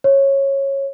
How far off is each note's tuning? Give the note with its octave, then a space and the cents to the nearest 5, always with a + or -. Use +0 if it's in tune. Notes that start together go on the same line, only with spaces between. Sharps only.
C#5 -15